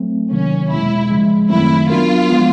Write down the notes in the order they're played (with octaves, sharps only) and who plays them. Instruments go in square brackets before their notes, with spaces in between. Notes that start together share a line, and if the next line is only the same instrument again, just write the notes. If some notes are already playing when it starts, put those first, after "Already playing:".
Already playing: [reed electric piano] F#3 A3 C4
[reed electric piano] D2 C3 D#3 F#3 A#3 [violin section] C#4
[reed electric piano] E2 B2 G#3 [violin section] E4
[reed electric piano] D#2 C#3 F3 G#3
[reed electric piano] F#2 D#3 F#3 A3 C4 [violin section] E4
[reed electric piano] F#3 B3 D4 F#4 A#4 [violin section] F4
[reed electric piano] F3 G#3 B3